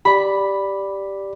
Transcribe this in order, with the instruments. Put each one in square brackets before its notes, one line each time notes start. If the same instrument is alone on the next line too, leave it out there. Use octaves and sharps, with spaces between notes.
[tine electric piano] G4 D5 [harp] B5